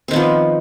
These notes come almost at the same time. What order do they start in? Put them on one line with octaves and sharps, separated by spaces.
C4 D#3 B3 F3